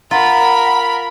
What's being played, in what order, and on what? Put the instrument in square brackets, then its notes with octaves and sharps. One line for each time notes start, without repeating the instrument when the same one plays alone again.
[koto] F4 [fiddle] A#4 B5 [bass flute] F#5 [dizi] A#5